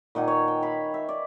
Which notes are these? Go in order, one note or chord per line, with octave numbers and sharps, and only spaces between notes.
A#2 D#3 F#5 G#5
C#5
G5
F5 B5
E5
D5